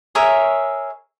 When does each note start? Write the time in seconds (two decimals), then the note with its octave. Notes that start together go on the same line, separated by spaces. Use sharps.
0.15 G#4 A#4 C#5 E5